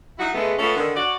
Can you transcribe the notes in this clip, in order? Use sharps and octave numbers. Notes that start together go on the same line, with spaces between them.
F#3 D#4 E4 F#4
C#3 G#3 A3 B3
A3 B3 C#4 F4 A4
D3 D#3
F#4 C#5 D5